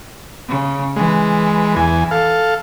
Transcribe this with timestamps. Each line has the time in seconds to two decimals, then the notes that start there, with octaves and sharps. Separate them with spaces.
0.48 C#3
0.96 E3 G#3
1.76 E2 G#5
2.11 A4 F5